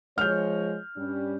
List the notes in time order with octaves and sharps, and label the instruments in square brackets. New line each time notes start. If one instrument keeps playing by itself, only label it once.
[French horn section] F3 G#3 C#5 [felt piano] F6 G6
[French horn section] G2 G3 C#4